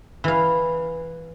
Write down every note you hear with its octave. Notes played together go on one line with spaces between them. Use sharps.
E3 F5